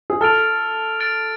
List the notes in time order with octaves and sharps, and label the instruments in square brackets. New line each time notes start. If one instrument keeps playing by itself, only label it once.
[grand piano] G#4
[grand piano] A4 [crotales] F6 A6 D7 F7
[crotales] F6 A6 D7 F7